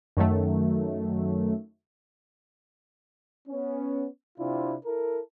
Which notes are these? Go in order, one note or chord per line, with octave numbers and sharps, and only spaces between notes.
F#2 D#3 F#3 A3
B3 C#4
C3 C4 D4 E4 F4
E4 A4 A#4